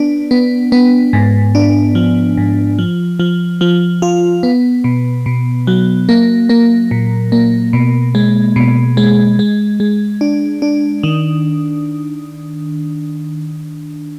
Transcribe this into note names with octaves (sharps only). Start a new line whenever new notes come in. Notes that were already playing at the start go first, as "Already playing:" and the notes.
Already playing: B3 D4
B3
B3
G#2
D4
F3
G#2
F3
F3
F3
F4
B3
B2
B2
F#3
A#3
A#3
A#2
A#3
B2
G#3
B2
G#3
G#3
G#3
D4
D4
D#3